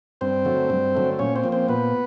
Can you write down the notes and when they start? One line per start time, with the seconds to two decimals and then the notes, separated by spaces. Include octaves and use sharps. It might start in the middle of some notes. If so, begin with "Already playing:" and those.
0.21 G2 C4 C5
0.45 D3 F#3 A3
0.70 G2
0.95 D3 F#3 A3
1.19 A#2 C#4 C#5
1.36 C4 C5
1.44 F3 A#3
1.52 C4 C5
1.68 A#2 B3 B4